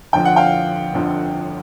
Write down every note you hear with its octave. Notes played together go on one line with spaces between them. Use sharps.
G1 F2 D3 F3 G5
F#5
F5 G5
G1 F2 D3 F3